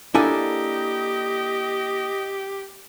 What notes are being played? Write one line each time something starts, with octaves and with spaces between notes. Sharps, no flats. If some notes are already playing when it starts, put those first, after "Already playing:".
A#3 D4 E4 G4 A4 D#5 E5 G#5